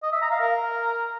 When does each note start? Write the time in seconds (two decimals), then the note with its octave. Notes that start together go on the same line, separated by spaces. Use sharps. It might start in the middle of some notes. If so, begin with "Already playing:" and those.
0.03 D#5
0.12 E5
0.22 A#5
0.31 F5
0.40 A#4